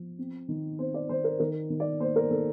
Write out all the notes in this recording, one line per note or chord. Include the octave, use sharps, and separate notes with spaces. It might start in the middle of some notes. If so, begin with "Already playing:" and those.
Already playing: F3
C4
D#3
C4 C5
D5
D#3 C5
A#4
D#3 A#4
D#3
D5
A#3 C5
A#4
D#3 A4